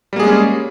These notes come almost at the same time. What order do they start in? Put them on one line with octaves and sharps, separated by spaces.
G3 A#3 G#4 G#3 C#4